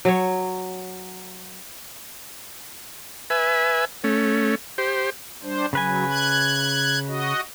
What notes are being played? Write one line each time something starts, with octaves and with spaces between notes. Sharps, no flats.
F#3 C#5
B4 E5 G#5
A3 C#4
G4 C5
G3 D4 C5
C#3 F#3 B4 G#5
F#6 G#6
F#4 D#5